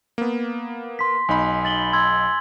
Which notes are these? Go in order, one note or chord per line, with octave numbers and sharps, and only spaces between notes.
A#3 B3
C6 B6
B1 D#4 G#5 B5
A6 F#7 G7
C6 E6 G#6